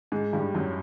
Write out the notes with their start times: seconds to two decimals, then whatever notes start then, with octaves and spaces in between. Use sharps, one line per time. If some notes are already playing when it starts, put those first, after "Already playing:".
0.12 G#2 G#3
0.33 G2 G3
0.54 F#2 F#3